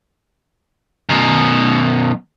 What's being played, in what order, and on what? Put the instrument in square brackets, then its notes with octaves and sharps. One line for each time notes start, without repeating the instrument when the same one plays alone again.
[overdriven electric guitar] F#2 B2